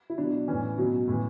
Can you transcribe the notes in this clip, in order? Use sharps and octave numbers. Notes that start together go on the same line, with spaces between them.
E4
B2 F#3 D4
A2 E3 C#4
B2 F#3
A2 E3